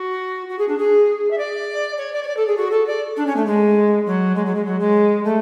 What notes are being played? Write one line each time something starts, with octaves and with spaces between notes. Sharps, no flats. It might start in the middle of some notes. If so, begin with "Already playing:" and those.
Already playing: F#4
F#4
G#4
D4
G#4
E5
D5
C#5
D5
C#5
D5
A4
G#4
F#4
A4
D5
D4
C#4
A3
G#3
F#3
G#3
F#3
G#3
F#3
G#3
A3